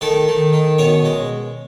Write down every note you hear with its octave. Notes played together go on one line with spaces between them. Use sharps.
D#3 A3 A4
D#3
D#3
B2 C#4 C#5
G#3